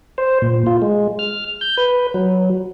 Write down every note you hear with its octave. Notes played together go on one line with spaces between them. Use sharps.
C5
A#2
F4
G#3
F6
G6
B4
F#3